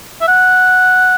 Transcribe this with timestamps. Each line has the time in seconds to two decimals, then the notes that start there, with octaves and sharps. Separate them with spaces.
0.21 E5
0.28 F#5